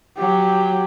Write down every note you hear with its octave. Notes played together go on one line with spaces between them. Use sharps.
F#3 G4